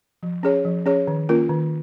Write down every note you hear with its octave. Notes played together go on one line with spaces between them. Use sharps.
F3
C#4 G#4 C#5
F3
C#4 G#4 C#5
D#3
A#3 C#4 F4 A#4
D#3